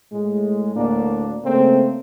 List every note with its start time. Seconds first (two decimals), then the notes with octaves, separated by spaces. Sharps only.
0.11 A2 G#3
0.76 D2 A2 A#3 D4
1.44 C#3 A3 A#3 C4